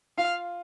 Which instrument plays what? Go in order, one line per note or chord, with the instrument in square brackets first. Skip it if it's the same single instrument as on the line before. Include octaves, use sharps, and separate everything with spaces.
[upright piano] F4 [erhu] F5